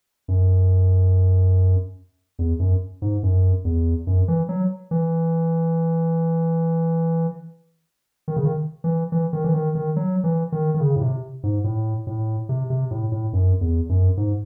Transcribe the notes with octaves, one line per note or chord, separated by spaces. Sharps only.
F#2
E2
F#2
G#2
F#2
E2
F#2
E3
F#3
E3
D#3
C#3
D#3
E3
E3
D#3
E3
D#3
D#3
F#3
E3
D#3
D#3
C#3
A2
C3
G#2
A2
A2
C3
C3
A2
A2
F#2
E2
F#2
G#2